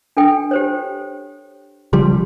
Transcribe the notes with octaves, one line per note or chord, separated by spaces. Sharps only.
D4 A4 G5
G4 C5 C#5
C#3 F3 G3 C6